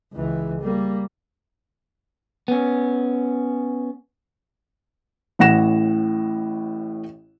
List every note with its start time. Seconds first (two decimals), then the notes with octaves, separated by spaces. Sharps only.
0.13 C#2 E3
0.61 G3 A#3
2.48 B3 C#4
5.39 A1 A2 F#5 A#6 E7